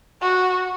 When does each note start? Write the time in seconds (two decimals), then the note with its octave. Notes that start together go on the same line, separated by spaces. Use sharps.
0.21 F#4